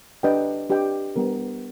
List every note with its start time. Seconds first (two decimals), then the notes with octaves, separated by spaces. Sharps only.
0.23 D4 G4 B4 D#5 G5
0.70 D4 G4 B4 D#5 G5
1.16 G3 B3 D4 G4 A#4